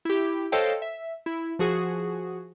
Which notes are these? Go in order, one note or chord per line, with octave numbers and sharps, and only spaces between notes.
E4 G4
A4 C5 C#5 D#5 F5 G5
E5
E4
F3 F#4 G#4